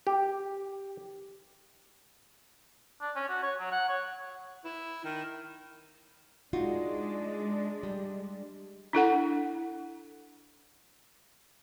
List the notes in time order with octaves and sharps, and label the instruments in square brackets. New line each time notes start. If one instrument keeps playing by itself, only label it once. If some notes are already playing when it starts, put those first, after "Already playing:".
[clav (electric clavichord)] G4
[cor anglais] D4
C#4
F#4
C#5
F#3
F#5
C#5
[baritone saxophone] E4
D#3
[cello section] G#3 D4 [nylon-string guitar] D#4 F4 F#4
[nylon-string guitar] G3
[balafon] D4 E4 A4 F#5